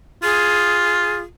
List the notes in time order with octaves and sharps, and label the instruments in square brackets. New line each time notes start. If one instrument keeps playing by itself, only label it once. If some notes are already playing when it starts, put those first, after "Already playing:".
[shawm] F4 [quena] G#4